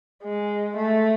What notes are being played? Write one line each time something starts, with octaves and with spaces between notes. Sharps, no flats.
G#3
A3